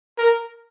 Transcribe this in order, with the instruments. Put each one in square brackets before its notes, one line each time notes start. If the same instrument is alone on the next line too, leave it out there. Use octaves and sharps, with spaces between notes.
[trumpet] A#4